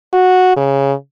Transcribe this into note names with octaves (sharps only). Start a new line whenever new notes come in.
F#4
C#3